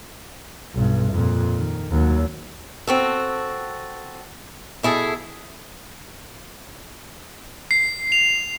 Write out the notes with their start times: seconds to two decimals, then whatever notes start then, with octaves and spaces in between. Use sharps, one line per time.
0.75 B1 G2
1.12 F2 A#2
1.56 D#3
1.91 D#2 F#3
2.87 C4 F#4 A4
4.83 B2 E4 G#4 A4
7.71 C7
8.12 F7